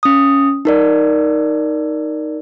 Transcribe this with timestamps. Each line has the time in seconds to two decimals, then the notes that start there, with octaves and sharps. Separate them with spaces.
0.03 C#4 D#6
0.65 D#4 A#4 D5